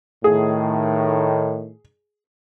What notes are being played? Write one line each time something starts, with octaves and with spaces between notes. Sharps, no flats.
A2 D#3 G#4